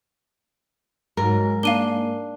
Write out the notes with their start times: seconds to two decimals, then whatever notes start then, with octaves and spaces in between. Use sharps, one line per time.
1.17 G#2 F#3 A#4
1.63 A#3 D4 F5 D#7 G7